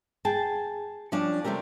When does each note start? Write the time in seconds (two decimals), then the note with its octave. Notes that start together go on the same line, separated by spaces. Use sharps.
0.25 G#4 G5 A5
1.12 F3 G3 C#4 D4
1.44 C3 G3 A3 G4 A#4